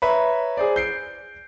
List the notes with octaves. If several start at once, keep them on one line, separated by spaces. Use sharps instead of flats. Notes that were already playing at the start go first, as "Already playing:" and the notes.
B4 C#5 E5 A#5 B5
G#4 C5 D5
G6 C7 D7